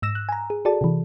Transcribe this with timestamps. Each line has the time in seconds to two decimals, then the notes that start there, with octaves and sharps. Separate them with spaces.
0.02 G#2 E6 A#6 E7
0.15 F#6
0.29 G#5 A#5
0.50 G#4
0.65 F#4 G#4 A4 D5 A5
0.81 C3 E3